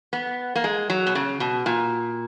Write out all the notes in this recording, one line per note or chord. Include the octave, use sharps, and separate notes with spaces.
B3
A#3
G#3
F#3
B2
C#3
B2
A#2